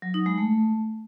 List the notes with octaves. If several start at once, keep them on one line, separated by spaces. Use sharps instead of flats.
F#3
D#4
G#3
A3